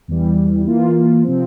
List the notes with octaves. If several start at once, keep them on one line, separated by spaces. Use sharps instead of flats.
E2 E3 G3
E3 A#3 F4
C3 F3 C4